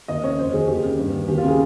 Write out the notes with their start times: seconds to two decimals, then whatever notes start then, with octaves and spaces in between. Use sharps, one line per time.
0.08 D#2 D#5
0.24 C#3 C#5
0.39 F2 C5
0.53 D#3 G#4
0.68 D#2 G4
0.84 C#3
0.99 G2
1.13 D#3
1.28 D#2 G4
1.38 F4
1.43 C#3 G#4